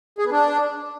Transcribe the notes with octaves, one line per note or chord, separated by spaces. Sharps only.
G#4
B3
D4